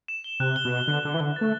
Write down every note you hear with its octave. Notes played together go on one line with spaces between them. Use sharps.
E7
G7
C3 F#6
G7
B2
F#6
D3 F#6
D3 E7
E3
D3 G7
A3 A6